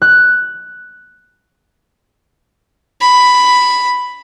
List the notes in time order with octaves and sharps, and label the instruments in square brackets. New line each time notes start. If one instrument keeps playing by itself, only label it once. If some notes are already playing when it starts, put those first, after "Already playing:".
[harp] F#6
[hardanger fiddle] B5